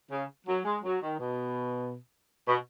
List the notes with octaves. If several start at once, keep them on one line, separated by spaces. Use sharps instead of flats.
C#3
F#3
G#3
F#3
D#3
B2
B2